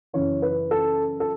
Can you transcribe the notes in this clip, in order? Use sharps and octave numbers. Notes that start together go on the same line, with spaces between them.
F#2 C#3 E3 C#5
B4
A4
A4